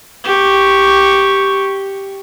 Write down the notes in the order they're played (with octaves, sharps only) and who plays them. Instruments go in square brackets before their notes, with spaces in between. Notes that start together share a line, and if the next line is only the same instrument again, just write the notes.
[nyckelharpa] G4 C#6